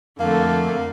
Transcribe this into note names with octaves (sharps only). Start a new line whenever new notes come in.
F2 D3 A3 A#3